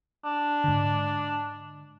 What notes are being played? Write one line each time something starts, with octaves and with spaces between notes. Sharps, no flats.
D4
G#2 D3